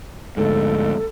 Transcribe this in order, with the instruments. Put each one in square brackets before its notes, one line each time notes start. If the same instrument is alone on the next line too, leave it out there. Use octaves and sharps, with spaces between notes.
[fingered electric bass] D2 G#2 [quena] A4